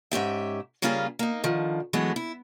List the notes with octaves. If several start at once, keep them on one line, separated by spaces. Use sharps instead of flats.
G#2 C#4 G4 E5
C#3 G3 A#3 C#4 F4 G#4
A#3 D#4
D3 D#3 F3
E3 F#3 G#3 A3 B3
E4